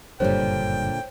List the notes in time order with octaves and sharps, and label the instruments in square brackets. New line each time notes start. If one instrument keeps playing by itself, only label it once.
[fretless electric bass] F#1 G2 G3 [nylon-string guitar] A#2 D3 [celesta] C5 C#5 [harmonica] G5